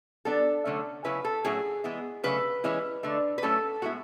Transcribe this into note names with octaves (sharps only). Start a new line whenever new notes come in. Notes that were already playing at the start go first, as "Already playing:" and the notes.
F#3 B3 D4 A4
D3 F#3 A3 C#4
C#3 F#3 C#4 E4 B4
A4
A2 F#3 C#4 E4 G#4
E3 G#3 B3 E4
C#3 F#3 A3 B4
E3 G#3 C#4 E4
D3 A3 D4
B4
A2 F#3 A3 C#4 E4 A4
A2 G#3 B3 E4 F#4